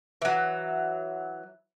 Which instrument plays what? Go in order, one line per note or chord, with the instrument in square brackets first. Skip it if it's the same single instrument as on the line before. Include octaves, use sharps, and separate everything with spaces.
[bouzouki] E3 F#3